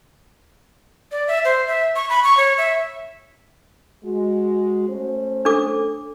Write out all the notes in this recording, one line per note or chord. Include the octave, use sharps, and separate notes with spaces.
D5
E5
C5
E5
C#6
B5
C#6
C#5
E5
G#3 F#4
A3 C#4 C5
D4 A4 D6